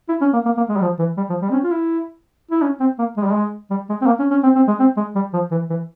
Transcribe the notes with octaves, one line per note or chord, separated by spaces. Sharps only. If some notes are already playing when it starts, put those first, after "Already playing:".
E4
C#4
A#3
A#3
A#3
G#3
G3
F3
E3
G3
F3
G3
C4
C#4
F4
E4
E4
C#4
C4
A#3
G#3
G3
G#3
G3
G#3
C4
A#3
C#4
C#4
C4
C4
G#3
C4
G#3
G3
F3
E3
E3